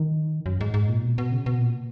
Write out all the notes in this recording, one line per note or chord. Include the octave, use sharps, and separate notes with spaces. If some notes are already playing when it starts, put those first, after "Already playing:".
Already playing: D#3
F#2
G#2
G#2
A#2
B2
B2
C#3
B2
A#2